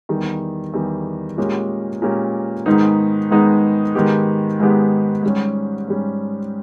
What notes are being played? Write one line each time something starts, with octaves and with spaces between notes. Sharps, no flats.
E2 D#3 G3
E2 D#3 G3
A#2 G#3 C#4 G4 A#4
A#2 G#3 C#4 G4 A#4
G#2 D#3 G#3 B3 D#4
G#2 D#3 G#3 B3 D#4
G#2 D#3 G#3 B3 G4
G#2 D#3 G#3 B3 G4
G#2 G3 C#4
G#2 G3 C#4